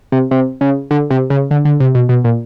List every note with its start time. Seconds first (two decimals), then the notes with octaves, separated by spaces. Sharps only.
0.12 C3
0.31 C3
0.61 C#3
0.91 D3
1.10 C3
1.30 C#3
1.51 D3
1.65 D3
1.80 C3
1.95 B2
2.09 B2
2.24 A#2